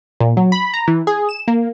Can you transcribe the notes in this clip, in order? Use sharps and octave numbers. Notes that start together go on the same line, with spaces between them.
A#2
F#3
B5
A#5
E3
G#4
E7
A#3